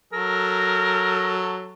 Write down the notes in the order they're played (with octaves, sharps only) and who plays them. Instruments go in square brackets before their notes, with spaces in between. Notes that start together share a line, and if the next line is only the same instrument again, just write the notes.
[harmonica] F#3 A4 [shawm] A#4